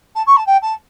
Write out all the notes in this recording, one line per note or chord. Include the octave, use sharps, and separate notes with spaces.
A5
C#6
A5
G5
A5